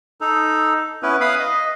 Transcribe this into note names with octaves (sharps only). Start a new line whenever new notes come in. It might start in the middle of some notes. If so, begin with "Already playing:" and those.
D#4 A4
B3 C#4 E4 B4
B4 F5 B5 D#6
D#5